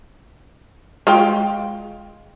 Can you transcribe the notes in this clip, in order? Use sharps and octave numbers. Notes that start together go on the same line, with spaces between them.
G#3 F4 G5